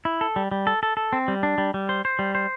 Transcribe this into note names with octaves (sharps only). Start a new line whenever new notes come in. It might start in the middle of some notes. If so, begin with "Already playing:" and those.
E4
A4
G3
G3
A4
A4
A4
C4
G3
D4
G3
G3
C5
C5
G3
C5